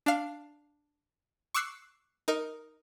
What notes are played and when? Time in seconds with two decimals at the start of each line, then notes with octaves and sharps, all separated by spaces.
0.06 D4 F5
1.54 C#6 D6 E6 F#6 C7 C#7
2.28 D#4 A#4